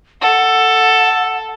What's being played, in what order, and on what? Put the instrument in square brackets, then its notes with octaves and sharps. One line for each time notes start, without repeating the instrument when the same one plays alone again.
[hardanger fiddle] A4 [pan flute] F#5